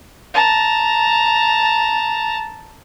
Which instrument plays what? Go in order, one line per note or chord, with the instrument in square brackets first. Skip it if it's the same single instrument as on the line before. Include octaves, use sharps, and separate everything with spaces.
[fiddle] A5 A#5